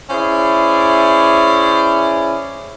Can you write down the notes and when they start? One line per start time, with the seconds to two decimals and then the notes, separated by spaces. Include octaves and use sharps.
0.10 C#4 E4 G#4 C5 D5